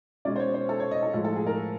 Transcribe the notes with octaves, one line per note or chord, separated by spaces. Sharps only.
B2 G#3 C#4 D5
C5
C#5
C5
A4
C#5
D#5
A4
A2 F3 G#3 A4
A4
G#4
A#4